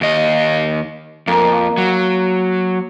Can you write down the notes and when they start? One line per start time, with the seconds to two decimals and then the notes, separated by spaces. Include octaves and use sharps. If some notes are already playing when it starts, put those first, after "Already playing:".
0.01 D#2 D#5
1.27 F2 A#3
1.78 F#3